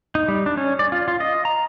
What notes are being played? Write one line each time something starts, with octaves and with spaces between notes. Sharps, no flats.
D#4
G3
D4
C#4
D5
F4
F4
D#5
A#5